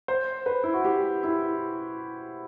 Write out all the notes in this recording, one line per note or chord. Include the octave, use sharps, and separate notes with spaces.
C5
B4
E4
F#4
G4
E4